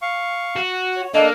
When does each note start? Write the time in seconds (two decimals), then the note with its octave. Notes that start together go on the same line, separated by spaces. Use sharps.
0.02 F5 C#6
0.56 F#4
0.96 C#5
1.14 A#3 D4 A4 D#5